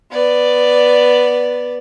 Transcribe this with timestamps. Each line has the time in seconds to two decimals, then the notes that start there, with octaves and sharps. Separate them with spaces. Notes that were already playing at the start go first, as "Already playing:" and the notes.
0.11 B3 D5